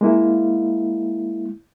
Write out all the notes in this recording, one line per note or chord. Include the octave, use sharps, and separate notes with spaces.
G#3 A#3 E4